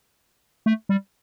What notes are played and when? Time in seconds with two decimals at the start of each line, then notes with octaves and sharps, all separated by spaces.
0.66 A3
0.89 G3